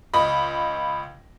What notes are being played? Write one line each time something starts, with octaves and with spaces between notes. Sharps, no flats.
C#2 D#5 B5